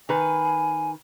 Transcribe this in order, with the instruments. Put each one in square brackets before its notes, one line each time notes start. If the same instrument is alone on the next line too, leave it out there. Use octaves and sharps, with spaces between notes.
[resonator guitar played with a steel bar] D#3 B4 [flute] G#5